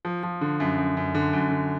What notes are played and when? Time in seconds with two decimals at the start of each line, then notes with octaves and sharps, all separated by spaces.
0.05 F3
0.23 F3
0.41 D3
0.60 F#2
0.78 F#2
0.97 F#2
1.15 D3
1.33 F#2
1.51 D3